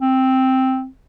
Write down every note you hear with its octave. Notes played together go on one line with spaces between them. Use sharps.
C4